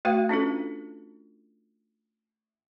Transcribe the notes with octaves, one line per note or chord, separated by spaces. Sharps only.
A3 F#4 B4 F5 G5
C#4 D4 F4 A4